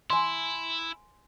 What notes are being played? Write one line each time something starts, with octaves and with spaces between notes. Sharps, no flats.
E4 G#5 C6